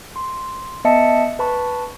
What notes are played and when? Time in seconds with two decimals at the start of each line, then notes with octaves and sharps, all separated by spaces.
0.16 C6
0.85 B3 D#5 E5 A5 C#7
1.39 B4 A5 B5 C#6